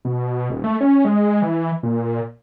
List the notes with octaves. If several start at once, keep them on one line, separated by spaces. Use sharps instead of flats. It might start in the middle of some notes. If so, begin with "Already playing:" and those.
B2
D#1
A3
C#4
G#3
E3
A#2